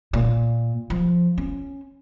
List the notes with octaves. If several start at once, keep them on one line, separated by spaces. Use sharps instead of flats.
A#2
F3
C#4